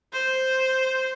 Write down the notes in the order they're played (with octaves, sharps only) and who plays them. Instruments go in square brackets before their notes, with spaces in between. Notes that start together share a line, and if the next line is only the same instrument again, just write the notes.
[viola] C5